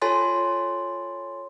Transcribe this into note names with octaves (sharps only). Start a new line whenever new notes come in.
F4 A4 C#5 G#5 C6 A6